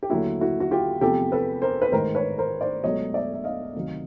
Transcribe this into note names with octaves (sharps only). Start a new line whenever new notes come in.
G4
D#2 D3 F#3 A3 E4 F#4
E4 F#4
F#4
F4 G4
E2 C3 F3 A3 G4 A4
A4 B4
A#4 C5
B4
A1 G#2 D#3 A#4 C5
B4 C#5
A#4 C5
C5 D5
C#2 B2 F#3 A3 C#5 D#5
D5 E5
E5
D#5 F5
D2 C3 D#3 F#3